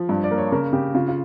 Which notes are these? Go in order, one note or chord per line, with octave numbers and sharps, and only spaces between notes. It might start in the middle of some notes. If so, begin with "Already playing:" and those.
Already playing: F3
G2
D5
A#3
C#5
C#3 A#4
C#3 G4
C#3 F4
F4